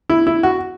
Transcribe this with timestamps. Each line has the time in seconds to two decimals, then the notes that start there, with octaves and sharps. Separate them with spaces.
0.10 E4
0.27 E4
0.43 F#4